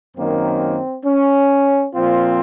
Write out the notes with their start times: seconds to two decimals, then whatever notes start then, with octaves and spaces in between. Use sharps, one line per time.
0.15 F#2 D#3 A#3 C4
1.05 C#4
1.94 A#2 F3 C4 F4